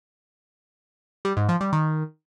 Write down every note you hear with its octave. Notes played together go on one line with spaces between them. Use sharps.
G3
G#2
F3
G3
D#3